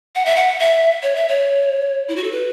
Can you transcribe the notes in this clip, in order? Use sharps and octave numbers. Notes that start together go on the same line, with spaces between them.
F#5
E5
F#5
E5
C#5
E5
C#5
E4
F#4
A4
B4